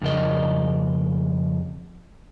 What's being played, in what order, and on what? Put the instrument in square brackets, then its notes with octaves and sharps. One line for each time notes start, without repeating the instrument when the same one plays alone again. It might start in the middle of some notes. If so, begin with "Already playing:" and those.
[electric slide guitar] F2 C#3 A#4 D#5